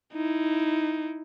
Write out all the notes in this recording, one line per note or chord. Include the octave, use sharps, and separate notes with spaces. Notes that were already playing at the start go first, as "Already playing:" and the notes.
D#4 E4